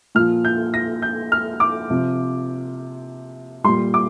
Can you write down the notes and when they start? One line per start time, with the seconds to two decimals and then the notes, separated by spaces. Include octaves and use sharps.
0.15 A#2 F3 F6
0.45 G6
0.74 A#6
1.02 G6
1.32 F6
1.60 D6
1.90 C3 F3
3.64 G3 C6
3.68 A#2
3.94 D6